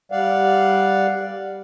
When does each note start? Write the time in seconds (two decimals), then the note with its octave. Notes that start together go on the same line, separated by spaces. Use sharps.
0.12 G3 D5 F5 F#5